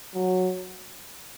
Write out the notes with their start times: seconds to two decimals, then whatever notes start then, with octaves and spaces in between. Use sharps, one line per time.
0.14 F#3